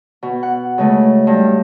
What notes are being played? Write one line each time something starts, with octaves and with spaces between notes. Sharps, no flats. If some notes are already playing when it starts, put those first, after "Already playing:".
B2
F#5
C#3 G#3 A3
G2